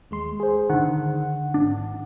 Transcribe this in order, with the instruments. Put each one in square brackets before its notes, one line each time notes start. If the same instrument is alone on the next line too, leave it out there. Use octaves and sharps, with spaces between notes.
[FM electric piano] D#2 G#3 C6
G#4 C5
[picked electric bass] D3 D#3 [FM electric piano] F#5
[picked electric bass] G#1 D4